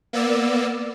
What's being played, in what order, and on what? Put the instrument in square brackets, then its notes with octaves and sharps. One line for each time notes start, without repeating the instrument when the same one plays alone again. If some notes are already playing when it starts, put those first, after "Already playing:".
[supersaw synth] A#3 B3 D5 E6